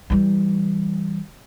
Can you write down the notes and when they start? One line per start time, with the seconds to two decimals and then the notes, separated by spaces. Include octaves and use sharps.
0.10 E3 G3